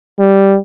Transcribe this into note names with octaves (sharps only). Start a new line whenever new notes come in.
G3